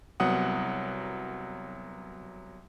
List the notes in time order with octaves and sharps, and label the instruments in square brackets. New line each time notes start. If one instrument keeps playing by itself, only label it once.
[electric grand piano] C2 F#3 B3 F#5 D#6